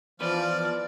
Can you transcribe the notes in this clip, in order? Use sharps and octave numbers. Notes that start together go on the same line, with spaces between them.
E2 F3 B4 D5 F6